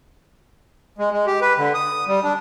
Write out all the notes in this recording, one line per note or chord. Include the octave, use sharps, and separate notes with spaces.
G#3
G#3
G4
B4
D3
D#6
G3
D4